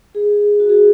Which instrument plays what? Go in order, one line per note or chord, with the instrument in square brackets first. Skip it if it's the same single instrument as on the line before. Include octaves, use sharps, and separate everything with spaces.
[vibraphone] G#4
F#4
G#4